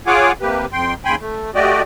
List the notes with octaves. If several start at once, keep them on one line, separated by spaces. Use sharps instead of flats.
F4 G#4 C#5 F#5 G#5 D6
C3 A#3 G4 B4
F2 G5 C6
D#2 C#3 G5 G#5 B5 C6
A3
A3 F#4 G4 D5 D#5